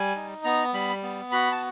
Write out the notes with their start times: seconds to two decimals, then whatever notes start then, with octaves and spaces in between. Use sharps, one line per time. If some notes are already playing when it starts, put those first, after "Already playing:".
Already playing: G3 G#5
0.16 D#4
0.44 B3 A#5
0.74 G3 B5
1.03 B3
1.32 F#4 B5
1.52 A5